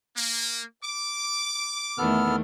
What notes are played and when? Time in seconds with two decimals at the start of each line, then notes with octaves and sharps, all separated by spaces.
0.17 A#3
0.84 D6
1.98 E2 D#3 A3 B3 A4 F6